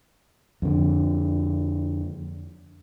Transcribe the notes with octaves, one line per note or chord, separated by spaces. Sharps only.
F2 D3